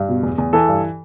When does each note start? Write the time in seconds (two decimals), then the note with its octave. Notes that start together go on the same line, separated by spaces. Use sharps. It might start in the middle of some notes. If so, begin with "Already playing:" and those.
Already playing: G2
0.09 B2
0.23 E2
0.38 E2
0.53 E3 A4
0.68 G2